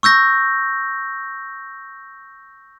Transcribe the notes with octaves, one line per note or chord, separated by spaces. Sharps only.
C#6 E6 G6 A#6